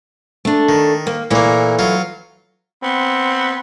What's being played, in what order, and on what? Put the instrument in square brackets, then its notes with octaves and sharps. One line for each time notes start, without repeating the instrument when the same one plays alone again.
[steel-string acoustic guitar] A3 D4
[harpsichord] D#3
[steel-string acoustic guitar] A#3
[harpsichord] A#2 A#3 [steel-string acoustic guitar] E3 A3
[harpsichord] F#3 F4
[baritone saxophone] B3 [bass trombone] C4